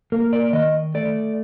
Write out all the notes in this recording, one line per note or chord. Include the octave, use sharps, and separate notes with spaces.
A#3 A#4
D5
D#3 D#5
A3 D5